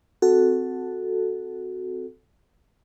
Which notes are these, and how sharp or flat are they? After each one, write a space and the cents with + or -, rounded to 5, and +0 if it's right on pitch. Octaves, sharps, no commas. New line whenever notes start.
C4 -20 F#4 +0 A4 +0